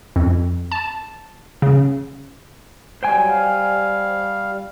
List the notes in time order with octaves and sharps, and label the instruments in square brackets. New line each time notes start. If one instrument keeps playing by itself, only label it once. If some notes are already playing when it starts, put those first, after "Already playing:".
[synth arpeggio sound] F2
A5
C#3
[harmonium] F#3 G3 [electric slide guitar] C5 G5 G#5
[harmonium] G3 F5